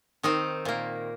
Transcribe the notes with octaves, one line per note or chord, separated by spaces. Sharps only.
D#3 C4 D#4
A#2 A#3